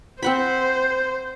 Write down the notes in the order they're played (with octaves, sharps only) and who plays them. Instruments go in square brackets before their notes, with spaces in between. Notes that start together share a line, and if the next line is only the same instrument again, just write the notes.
[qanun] C4 F#5 B5 [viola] C5